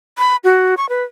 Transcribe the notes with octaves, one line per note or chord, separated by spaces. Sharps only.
B5
F#4
C#6
B4